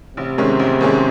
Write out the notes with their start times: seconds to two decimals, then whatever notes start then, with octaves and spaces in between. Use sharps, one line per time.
0.17 A1 C3
0.38 G#2 D#3 G#3 C#4
0.59 A1
0.81 G#2 D#3 G#3 C#4